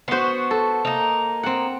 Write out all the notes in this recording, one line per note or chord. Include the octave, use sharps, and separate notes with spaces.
B3 F#4 C5 C6
A4
A#3 D#4
C4 F#5